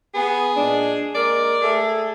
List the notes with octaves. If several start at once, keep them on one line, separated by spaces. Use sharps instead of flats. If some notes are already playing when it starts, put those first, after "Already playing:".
B3 G#4
A#2 G#3 D4
G#3 A#3 A#4 D5
A3 G#4 A4